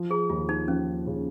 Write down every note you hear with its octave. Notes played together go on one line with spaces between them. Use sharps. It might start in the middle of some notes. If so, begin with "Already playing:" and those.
Already playing: F3
G#4
D#2 F4
D#4
F3 C#4
C#3